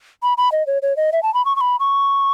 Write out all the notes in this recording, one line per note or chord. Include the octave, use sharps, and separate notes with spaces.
B5
B5
D#5
C#5
C#5
D#5
E5
A5
B5
C#6
C#6
B5
C#6